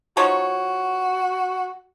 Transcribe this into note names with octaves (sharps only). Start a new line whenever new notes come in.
F3 D#4 F#4 C#5